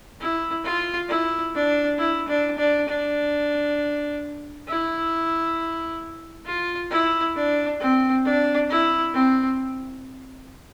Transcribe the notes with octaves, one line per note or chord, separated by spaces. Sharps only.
E4
F4
E4
D4
E4
D4
D4
D4
E4
F4
E4
D4
C4
D4
E4
C4